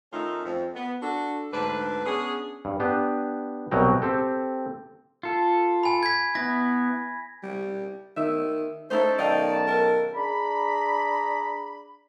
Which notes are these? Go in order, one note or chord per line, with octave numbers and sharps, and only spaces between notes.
D#3 A3 C#4 D#4 F4 E5
F2
B3
D4 F#4 A4
D2 G#2 D3 D4 B4
B3 C#4 D4 G#4
G2
B3 D4 G4 B4
C2 B2 F#3 F#4 G5 A#5
C4 G4 A4
F4 A4
G#5 B5
G#6 B6
B3 E4 A#6
G3
D#3 E5
C#4 D#4 E4 A4 C5
B1 D#3 D5 D#5 F5 G5 A5
A#4
D4 G#4 A#5 B5